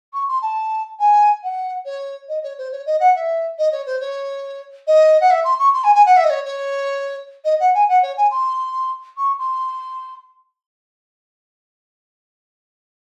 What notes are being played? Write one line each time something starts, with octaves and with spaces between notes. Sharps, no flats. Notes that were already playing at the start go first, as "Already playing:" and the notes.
C#6
C6
A5
G#5
F#5
C#5
D#5
C#5
C5
C#5
D#5
F#5
E5
D#5
C#5
C5
C#5
D#5
F#5
E5
C6
C#6
C6
G#5
G#5
F#5
E5
D#5
C#5
C#5
D#5
F#5
G#5
F#5
C#5
G#5
C6
C#6
C6